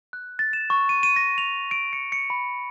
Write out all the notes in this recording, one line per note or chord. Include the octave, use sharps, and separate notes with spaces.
F#6
A6
E7
C#6
D#7
D#7
A#6
F7
D7
C#7
C#7
B5